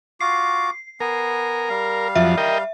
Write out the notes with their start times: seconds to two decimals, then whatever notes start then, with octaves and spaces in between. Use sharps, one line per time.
0.21 F4 F#4 D6 C7
1.00 B3 A#4 G#5
1.69 G3 F5
2.15 F2 F3 F#3 E5
2.38 A#4 D#5 G5